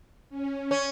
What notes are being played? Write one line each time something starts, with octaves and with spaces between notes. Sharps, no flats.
C#4
C#4